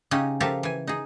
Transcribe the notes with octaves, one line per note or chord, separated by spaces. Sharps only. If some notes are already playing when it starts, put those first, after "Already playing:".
C#3 C#4 D#4 G4 D#5 G#5
F3 G4 A4 A#4 E5 F5
E3 G#5
D#4 G#4